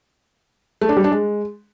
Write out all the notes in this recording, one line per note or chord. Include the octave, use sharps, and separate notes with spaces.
A3
D4
G3
D4
G#3